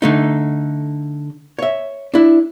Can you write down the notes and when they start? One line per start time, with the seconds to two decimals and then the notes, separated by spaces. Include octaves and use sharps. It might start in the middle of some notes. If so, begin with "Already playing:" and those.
0.02 D3 A3 D#4
1.59 C#5 E5
2.14 D4 E4